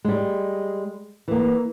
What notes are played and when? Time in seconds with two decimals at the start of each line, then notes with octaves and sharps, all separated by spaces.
0.05 G3 G#3
1.28 E3 A#3